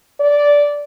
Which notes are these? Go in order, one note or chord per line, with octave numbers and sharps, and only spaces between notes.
D5